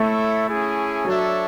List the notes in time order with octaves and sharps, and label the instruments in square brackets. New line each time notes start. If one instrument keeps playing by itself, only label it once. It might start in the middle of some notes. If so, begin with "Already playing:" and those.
Already playing: [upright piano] A3 [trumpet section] E4 A4 C#5 E5
[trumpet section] C#4 E4 G#4
[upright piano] F#3 [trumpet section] D4 A4 C#5 E5